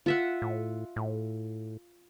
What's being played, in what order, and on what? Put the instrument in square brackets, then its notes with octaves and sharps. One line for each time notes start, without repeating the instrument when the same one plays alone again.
[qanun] F4 E5 F#5
[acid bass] A2
A2